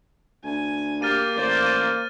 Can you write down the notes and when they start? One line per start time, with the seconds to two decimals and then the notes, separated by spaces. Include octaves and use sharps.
0.44 D2 G#5
1.02 A#3 G4 F6 A6 D#7
1.36 A1 C5 D5
1.66 D#7